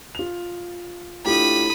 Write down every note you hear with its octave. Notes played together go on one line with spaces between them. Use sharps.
F4 F7
A2 D4 F4 G4 B5 D#6